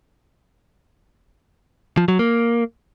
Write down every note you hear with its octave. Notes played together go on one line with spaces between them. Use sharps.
F3
F#3
A#3